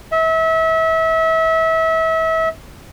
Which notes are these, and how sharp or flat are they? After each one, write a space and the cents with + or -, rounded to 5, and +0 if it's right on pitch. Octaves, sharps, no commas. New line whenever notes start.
E5 -30